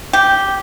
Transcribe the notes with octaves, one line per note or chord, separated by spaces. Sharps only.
G4